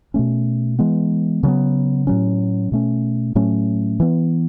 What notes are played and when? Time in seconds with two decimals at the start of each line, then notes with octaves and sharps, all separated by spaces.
0.14 B2 A3 C#4
0.79 E3 G#3 B3
1.43 C#3 F#3 B3
2.07 A2 F#3 C#4
2.72 B2 A3 C#4
3.35 A2 F#3 A3 C#4
4.00 E3 B3